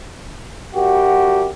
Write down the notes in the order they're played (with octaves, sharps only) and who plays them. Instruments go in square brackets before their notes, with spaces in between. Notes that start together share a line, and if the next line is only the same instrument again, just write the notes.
[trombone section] F#2 F#4 G4